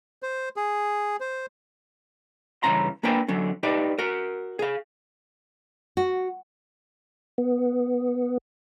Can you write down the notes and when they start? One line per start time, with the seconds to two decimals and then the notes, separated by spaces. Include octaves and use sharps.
0.23 C5
0.56 G#4
1.20 C5
2.63 G2 C#3 E3 C#4 A#5 C6
3.03 A#3 D4 B4 G5 G#5
3.28 D3 F#3 C#4
3.63 D#4 G4 B4 D5
3.98 F#4 A#4
4.59 G#4 F5
5.97 F#4
7.38 B3